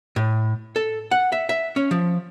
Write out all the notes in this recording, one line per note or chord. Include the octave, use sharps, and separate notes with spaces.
A2
A4
F#5
E5
E5
C#4
F3